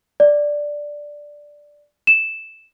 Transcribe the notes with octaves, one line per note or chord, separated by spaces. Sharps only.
D5
E7